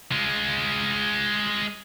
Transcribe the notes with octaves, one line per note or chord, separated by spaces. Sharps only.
G#3 F4